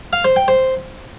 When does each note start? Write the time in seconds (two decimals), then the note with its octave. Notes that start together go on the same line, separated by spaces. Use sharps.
0.13 F5
0.25 C5
0.36 G5
0.48 C5